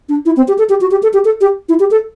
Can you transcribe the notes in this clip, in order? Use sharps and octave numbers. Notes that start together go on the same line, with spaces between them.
D4
E4
C4
G4
A4
G4
F#4
G4
A4
G4
A4
G4
E4
G4
A4